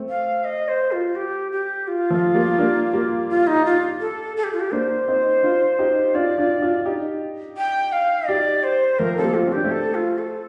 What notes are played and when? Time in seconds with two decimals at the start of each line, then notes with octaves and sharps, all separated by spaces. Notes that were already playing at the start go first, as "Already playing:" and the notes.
Already playing: A3 C4
0.09 F5
0.45 D#5
0.68 C5
0.92 F4
1.15 G4
1.52 G4
1.88 F4
2.10 F3 A3
2.34 G3 A#3
2.58 A#3 D4
2.93 G3 A#3
3.30 F4
3.47 D#4
3.65 F4
4.01 A4
4.37 A4
4.44 G4
4.53 F4
4.60 G4
4.72 A#3 D4 C5
5.08 C4 D#4
5.43 D4 F4
5.79 D#4 G4
6.14 D4 F4 D5
6.38 D4 F4
6.62 D4 F4
6.86 D#4 G4
7.57 G5
7.92 F5
8.28 D#4 G4 D5
8.64 C5
8.99 F3 A3 A#4
9.17 C4 A4
9.23 G3 A#3
9.35 F4
9.47 C4
9.52 D4 G4
9.64 A3 C4
9.71 A4
9.95 F4
10.18 A4